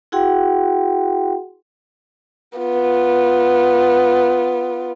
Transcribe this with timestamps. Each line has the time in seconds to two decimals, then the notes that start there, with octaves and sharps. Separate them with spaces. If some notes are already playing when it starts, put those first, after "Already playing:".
0.12 E4 F#4 G#4 F#5 G5 C6
2.58 B3 F4